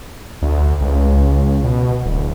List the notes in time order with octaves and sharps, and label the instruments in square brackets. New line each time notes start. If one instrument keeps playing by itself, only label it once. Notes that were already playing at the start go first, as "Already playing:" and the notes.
[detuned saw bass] D2
C#2
B2
D1